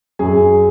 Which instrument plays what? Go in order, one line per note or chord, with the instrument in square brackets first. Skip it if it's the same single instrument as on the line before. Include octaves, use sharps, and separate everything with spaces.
[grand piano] F#2 G#4